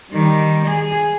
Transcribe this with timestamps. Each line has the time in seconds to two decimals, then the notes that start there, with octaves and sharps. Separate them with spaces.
0.11 D#3 G3
0.66 G#4